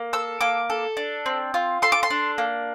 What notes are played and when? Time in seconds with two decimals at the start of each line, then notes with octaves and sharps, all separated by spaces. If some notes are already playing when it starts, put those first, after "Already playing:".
Already playing: A#3
0.13 A4 E6
0.41 A#3 D6
0.70 A4
0.97 D4
1.26 C4
1.54 F4
1.82 A4 C6
1.92 D6
2.03 C6
2.10 D4
2.38 A#3